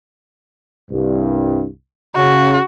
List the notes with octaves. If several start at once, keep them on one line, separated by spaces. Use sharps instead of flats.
C2 G2
C#3 F#4